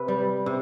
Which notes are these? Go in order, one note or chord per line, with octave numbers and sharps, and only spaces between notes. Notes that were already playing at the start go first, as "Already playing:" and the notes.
Already playing: C3 B4
G3
C3